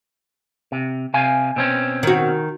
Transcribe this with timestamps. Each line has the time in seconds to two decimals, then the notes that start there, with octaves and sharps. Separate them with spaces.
0.72 C3
1.14 C3 F5 G#5
1.56 B2 C4 C#4
2.03 D#3 F#4